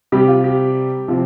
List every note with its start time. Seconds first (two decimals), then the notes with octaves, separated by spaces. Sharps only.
0.12 C3 G3 C4 G4
0.28 F4
0.44 G4
1.08 C3 F3 C4